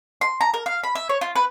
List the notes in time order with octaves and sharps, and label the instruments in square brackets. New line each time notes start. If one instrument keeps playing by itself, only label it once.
[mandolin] C6
A#5
A#4
F5
B5
E5
C#5
F4
B4